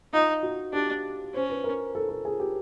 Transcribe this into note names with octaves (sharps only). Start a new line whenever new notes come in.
D#4 F4
F#4
D4 G4
C#4 C5
B4
A#4
A4
A4
G#4
G4